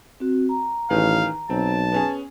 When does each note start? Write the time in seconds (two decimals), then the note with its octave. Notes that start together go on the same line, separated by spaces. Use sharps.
0.20 C4 F#4
0.49 A#5
0.90 A1 D#3 G#4 B4 F5
1.50 B1 C4 A5
1.92 B3 C#4 G#4